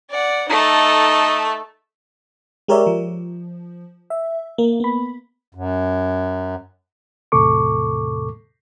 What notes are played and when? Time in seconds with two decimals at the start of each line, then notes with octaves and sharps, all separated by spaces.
0.10 D5 F#5
0.50 A3 D#4 A4 D#5
2.68 G#3 G4 A#4 C#5 D5 E5
2.87 F3
4.10 E5
4.58 A#3
4.80 B3 B5
5.55 F#2
7.32 E2 A2 C3 A4 C#6 D6